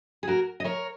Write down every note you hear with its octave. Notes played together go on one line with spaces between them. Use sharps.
G#4
F#4 A#4
D#5
A#4 C#5